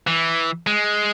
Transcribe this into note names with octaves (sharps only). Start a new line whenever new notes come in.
E3
G#3